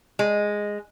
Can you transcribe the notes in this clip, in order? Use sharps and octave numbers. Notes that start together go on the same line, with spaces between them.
G#3